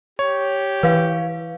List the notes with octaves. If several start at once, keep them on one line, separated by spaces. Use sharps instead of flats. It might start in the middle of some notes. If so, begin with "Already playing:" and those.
G4 C#5
E3 B4 F5